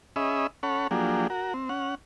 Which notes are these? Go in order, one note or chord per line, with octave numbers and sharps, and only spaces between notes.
C#4 G#4 D#5 E5 B5
C#4 A4 C#5 F#5 B5
F3 F#3 A#3 D4 G4 G#4
F#4 A#4
C4
C#4 F#5